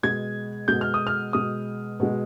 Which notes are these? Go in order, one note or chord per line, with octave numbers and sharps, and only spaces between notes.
B2 G#3 G#6
B2 G#3 G6
F6
D#6
F6
B2 G#3 D#6
B2 G#3